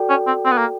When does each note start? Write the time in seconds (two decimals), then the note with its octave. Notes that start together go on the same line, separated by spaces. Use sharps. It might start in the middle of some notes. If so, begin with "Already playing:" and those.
Already playing: F#4 A4 D5 G5
0.09 C#4
0.27 C4
0.45 C4
0.52 B3
0.58 A#3